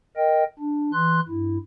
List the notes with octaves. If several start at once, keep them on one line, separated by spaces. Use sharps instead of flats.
A#4 D#5 G5
D4
E3 C6 F#6
G2 E4